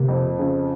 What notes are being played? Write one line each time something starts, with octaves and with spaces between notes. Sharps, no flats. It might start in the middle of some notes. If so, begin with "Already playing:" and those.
Already playing: C3 A#3
F2
C#3